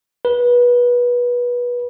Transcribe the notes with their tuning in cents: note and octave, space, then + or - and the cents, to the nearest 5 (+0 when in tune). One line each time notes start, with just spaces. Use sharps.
B4 -25